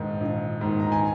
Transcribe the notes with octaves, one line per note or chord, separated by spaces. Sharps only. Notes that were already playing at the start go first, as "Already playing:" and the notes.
Already playing: A#1 G#2 D#3
A#1
G#2 D#3
A#5
G#5